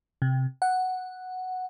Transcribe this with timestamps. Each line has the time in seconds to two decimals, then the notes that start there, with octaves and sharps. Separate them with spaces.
0.22 C3
0.62 F#5